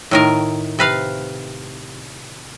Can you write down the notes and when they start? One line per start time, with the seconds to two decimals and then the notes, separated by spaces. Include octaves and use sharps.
0.11 A2 D#3 A#4
0.79 C3 B4 F5